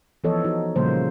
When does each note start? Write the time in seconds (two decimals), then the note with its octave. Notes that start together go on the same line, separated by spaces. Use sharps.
0.24 E3 F3 B3 A4 C#5 D#5
0.44 D#4 F#4
0.76 A#2 C#3 F3 G3 A#3 C5